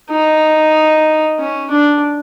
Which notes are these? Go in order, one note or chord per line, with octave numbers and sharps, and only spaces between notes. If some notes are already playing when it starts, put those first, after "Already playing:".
D#4
C#4
D4